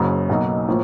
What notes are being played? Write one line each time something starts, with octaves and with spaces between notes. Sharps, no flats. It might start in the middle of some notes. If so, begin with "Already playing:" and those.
Already playing: F#1 F#2 C#3
B1 B2 F#3 A#3 D#4
A2 F3 A#3